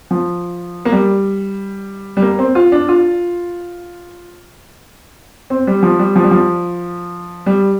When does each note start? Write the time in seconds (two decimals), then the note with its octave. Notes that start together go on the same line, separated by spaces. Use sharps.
0.11 F3
0.85 A#3
0.92 G3
2.17 G3
2.22 A#3
2.39 C4
2.55 F4
2.72 D4
2.89 F4
5.50 C4
5.67 G3
5.83 F3
5.99 G3
6.15 F3
6.24 G3
6.31 F3
7.46 G3